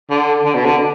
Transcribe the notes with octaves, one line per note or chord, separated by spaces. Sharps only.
D3
D3
B2
D3